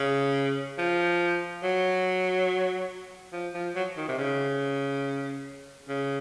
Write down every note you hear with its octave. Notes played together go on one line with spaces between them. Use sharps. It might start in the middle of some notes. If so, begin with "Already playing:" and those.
Already playing: C#3
F3
F#3
F3
F3
F#3
D#3
C3
C#3
C#3